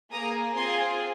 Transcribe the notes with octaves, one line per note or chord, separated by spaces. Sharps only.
A#3 G#4 A#5 D#6
C4 F4 G#4 G#5 C6